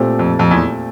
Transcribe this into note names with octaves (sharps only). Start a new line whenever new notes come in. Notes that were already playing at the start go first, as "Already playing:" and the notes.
Already playing: A#2 A3 C4 G4 C5
F2
F2
E2